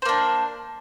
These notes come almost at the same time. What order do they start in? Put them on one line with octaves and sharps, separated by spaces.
C5 A#3 D4